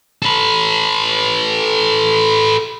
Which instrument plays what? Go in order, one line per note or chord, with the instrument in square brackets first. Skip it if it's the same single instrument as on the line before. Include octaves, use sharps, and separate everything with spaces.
[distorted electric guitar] A4 B4